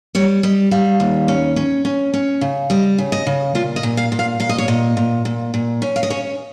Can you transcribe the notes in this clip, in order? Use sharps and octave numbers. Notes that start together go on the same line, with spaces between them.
G3 C#5
G3 D#5
G3 F5
D#2
C#4
C#4
C#4
C#4
C#3
G3 D#5
C#3
D#5
C#3
A#2 F4
D#5
A#2
F5
A#2
F5
A#2 F5
D#5
C#5
A#2 D#5
A#2
A#2
A#2
C#4
F5
D#5
C#4 C#5